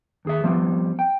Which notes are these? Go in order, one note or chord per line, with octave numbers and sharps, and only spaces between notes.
D#2 G#4 E5
F3 G3 B3 C4
G5